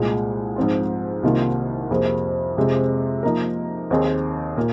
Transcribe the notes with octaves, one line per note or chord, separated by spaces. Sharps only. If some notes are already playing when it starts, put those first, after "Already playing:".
Already playing: C2 A#2 G#3
G#2 F3 C4 F4
C2 C3 D#3 A#3 F4
F2 C3 F3 A#3 G#4
F2 C3 G#3 C4
F3 A#3 D#4 A#4
D#2 D#3 C4 G#4
A#2 A#3